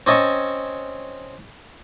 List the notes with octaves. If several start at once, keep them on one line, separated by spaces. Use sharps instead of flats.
C4 C#4 D#5 A5 C#6